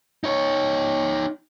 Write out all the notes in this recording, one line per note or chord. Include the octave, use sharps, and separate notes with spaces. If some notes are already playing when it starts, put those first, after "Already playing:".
D#4 C#5